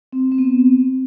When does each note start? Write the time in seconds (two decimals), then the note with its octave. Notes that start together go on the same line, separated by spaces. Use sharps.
0.13 C4
0.32 C4
0.38 B3